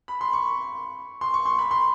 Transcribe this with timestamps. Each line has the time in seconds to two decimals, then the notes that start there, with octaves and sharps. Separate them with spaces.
0.08 B5
0.21 C6
0.33 C#6
1.21 C6
1.34 C#6
1.46 C6
1.59 B5
1.71 C6